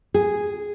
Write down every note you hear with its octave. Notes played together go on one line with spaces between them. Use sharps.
G#4